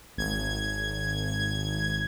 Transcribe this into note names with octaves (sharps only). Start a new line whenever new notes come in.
G#1 G#6